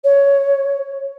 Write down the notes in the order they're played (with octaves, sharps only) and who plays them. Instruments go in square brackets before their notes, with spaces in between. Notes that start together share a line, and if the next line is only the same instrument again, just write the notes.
[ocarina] C#5